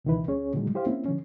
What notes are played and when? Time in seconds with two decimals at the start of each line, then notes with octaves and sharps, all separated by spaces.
0.05 C#2 B2 D#3 E3 E4 B4
0.28 D2 C#4 G#4 C#5
0.54 A#2 D3 D#3 F#3 G#3
0.74 E4 G4 C5 F5
0.86 A#3 C4 C#4 E4
1.06 D3 F3 C#4